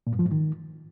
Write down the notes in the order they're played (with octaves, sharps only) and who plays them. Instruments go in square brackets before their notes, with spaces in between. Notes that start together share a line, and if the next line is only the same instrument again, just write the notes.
[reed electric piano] A#2
G2
F3
G#2
D#3